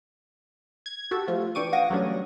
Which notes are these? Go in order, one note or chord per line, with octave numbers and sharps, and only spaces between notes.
G#6
F#4 G4 A4
F3 A3 F4
E3 D4 G5 C#6 D6 D#7
F5 F#5 D6 D#6 G#6 A#6
E3 F#3 G3 A3 C#4 D4